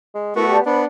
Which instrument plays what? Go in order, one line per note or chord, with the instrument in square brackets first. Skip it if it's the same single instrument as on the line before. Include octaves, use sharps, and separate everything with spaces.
[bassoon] G#3
[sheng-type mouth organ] A3 F#4 [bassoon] B3 [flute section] E4 A#4
[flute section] G4 D5 A5
[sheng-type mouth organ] B3 [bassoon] D4 [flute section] C5 B5